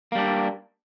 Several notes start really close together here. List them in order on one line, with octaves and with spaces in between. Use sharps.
A#3 G3 D4